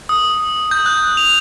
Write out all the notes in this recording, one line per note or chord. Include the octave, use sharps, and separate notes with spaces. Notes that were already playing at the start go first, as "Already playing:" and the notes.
D#6
G6
F#6
F7